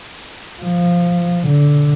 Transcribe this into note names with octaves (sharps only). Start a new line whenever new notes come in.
F3
D3